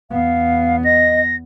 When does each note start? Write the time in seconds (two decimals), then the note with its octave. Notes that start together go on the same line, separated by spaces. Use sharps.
0.11 E2 B3 F5
0.85 D#5 A#6